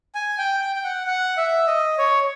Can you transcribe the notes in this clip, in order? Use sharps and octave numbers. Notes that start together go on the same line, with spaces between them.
G#5
G5
G5
G5
F#5
F#5
E5
D#5
C#5